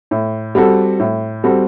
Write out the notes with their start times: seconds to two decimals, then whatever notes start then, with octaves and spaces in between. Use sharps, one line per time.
0.11 A2
0.55 G3 C4 F#4 A4
0.99 A2
1.44 G3 C4 F#4 A4